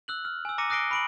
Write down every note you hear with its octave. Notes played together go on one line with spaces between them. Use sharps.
E6 F#6 F#7
F6
G#5 E6
A#5 D6 A#6 C#7 D#7
D#6 F#6 A#6 C7 D7 G7
B5 D7 F#7